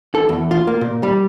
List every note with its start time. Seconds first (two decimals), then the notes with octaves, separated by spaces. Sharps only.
0.15 A4
0.29 E2
0.51 F4
0.67 A#3
0.81 A#2
1.03 G3